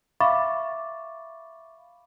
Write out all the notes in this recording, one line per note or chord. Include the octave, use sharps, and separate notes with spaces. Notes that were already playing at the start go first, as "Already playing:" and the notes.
E5 F5 B5 C#6 D6 A6